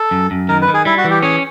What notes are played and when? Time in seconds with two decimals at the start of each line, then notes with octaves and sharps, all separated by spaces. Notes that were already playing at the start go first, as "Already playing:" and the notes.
Already playing: A4
0.11 F#2
0.31 F#2
0.49 D#3 A#4
0.62 B4
0.68 D#3
0.74 G#4
0.85 G3 E4
0.98 F#4
1.04 E3
1.10 G4
1.23 C#4 G#4